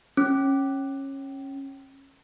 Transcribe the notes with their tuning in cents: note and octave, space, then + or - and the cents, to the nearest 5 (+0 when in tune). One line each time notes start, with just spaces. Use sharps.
C#4 -20